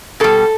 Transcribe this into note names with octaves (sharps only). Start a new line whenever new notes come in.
B2 G3 A4